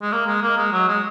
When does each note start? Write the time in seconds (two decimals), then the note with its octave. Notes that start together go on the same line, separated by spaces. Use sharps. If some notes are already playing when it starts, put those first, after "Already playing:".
0.02 G#3
0.12 A#3
0.26 G#3
0.42 A#3
0.58 G#3
0.72 F#3
0.88 G#3